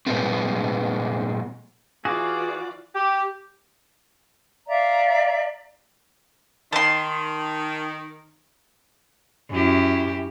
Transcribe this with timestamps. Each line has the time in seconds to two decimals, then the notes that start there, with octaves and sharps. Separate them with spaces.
0.06 A#2 C#3 G3 G#3 B3 C4
2.05 E3 F4 F#4 G#4 D5 D6
2.95 G4
4.68 D5 E5 F5 A#5
6.73 D#3 A5 C6
9.50 F#2 E4 G4